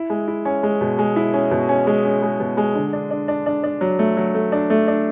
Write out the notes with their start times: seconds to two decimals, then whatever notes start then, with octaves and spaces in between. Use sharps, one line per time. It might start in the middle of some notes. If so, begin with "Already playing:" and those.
Already playing: E4
0.10 G#3
0.28 E4
0.45 C#4
0.63 G#3
0.81 B2
0.99 G#3
1.16 E4
1.34 C#4
1.51 B2
1.69 C#4
1.87 G#3
2.05 C#4
2.23 G#3
2.40 B2
2.57 G#3
2.75 D3
2.93 D4
3.11 D4
3.28 D4
3.46 D4
3.64 D4
3.81 F#3
3.99 A3
4.17 F#3
4.35 A3
4.52 D4
4.70 A3
4.88 D4